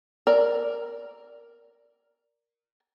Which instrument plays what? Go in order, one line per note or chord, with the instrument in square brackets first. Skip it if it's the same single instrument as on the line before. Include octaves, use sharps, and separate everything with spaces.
[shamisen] A#4 D5